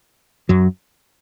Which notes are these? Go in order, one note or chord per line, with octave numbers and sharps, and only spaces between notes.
F#2 F#3